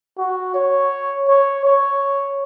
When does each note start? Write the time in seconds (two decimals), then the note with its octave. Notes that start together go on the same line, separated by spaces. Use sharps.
0.18 F#4
0.54 C#5
1.28 C#5
1.65 C#5